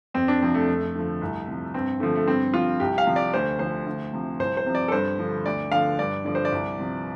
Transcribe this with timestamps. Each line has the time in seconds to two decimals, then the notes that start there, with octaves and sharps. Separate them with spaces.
0.14 F2 C4
0.28 D4
0.41 C3 F3 C4
0.54 A3
0.68 F2
0.95 D3 F3
1.21 C2
1.47 C3 F3
1.74 G2 C4
2.00 D3 F3 A3
2.15 A3
2.27 G2 C4
2.54 F3 F4
2.80 C2 G4
2.98 F5
3.06 C3 F3
3.16 D5
3.34 D2 C5
3.59 D3 F3 C5
3.86 D2
4.13 C3 F3
4.39 C2 C5
4.57 C5
4.66 C3 F3
4.75 D5
4.88 A4
4.92 G2 C5
5.19 D3 F3
5.45 D2 D5
5.72 D3 F3 F5
5.99 G2 D5
6.25 D3 F3 D5
6.35 C5
6.45 D5
6.52 C2
6.79 C3 F3